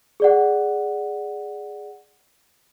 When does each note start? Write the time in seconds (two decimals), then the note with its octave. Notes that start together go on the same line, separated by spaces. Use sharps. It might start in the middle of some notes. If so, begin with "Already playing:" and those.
0.20 G#4 D5 F#5